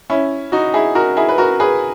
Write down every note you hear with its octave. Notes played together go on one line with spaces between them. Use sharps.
C#4 E4
D#4 F#4
E4 G#4
F#4 A#4
E4 G#4
B4
F#4 A#4
G#4 B4